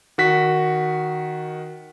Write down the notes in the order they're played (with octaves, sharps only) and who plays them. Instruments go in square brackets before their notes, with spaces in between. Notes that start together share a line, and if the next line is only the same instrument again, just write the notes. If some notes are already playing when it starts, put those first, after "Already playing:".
[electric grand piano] D#3 F#4 B6